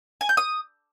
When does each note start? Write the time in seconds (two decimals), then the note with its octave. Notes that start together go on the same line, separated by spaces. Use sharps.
0.21 G#5
0.29 G6
0.37 D#6